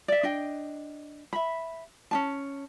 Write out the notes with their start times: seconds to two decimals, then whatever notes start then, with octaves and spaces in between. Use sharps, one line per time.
0.08 D5 E5
0.23 D4 D#5 G5
1.33 E5 B5
2.11 C#4 D4 A5